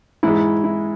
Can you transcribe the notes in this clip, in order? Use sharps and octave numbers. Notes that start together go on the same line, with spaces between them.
G#2 E3 G#3 E4
E4